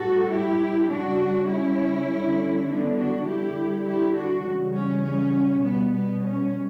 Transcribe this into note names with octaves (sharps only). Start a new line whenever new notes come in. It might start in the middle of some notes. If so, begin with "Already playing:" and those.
Already playing: A2 G3 F#4 A4
E4 G4
C#3 G3 D4 F#4
C#4 E4
D3 G3
B3 D4
D4 F#4
D3 G3 E4 G4
E4 G4
D4 F#4
C#3 E3 G3
C#4
C#4
B2 G3 B3
B3
C#4